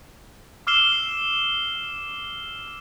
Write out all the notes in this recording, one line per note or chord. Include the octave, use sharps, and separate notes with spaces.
D6 E6 F6 C7 E7 G7